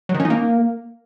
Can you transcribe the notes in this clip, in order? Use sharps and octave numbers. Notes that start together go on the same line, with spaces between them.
F#3
D#3
C#4
D#4
A#3